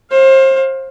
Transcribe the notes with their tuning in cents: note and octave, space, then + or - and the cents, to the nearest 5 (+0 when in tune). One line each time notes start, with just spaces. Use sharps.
C5 +30 F5 +15